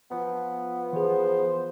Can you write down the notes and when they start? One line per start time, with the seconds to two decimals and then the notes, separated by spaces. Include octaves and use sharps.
0.11 F3 B3
0.93 E3 G#4 C5